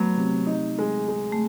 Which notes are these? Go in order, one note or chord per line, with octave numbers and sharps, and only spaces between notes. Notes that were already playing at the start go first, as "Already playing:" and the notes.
Already playing: F#3 A3 B3
C3
D#4
G#3
G#3
A3